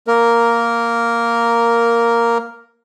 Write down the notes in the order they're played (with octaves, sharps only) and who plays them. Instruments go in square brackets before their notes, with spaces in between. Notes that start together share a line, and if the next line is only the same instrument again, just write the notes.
[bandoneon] A#3 A#4